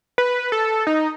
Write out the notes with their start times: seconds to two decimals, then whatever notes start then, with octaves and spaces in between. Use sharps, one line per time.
0.18 B4
0.52 A4
0.87 D#4